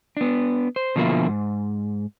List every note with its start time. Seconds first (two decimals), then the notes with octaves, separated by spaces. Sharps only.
0.17 B3 D4
0.76 C5
0.96 B2 D3 F3 A#3 D#4 E4
1.29 G#2